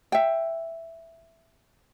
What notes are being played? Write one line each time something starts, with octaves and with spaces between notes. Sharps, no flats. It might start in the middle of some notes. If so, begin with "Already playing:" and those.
E5 G5